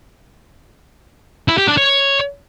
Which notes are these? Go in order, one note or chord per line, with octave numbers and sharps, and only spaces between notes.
E4
G4
D4
C#5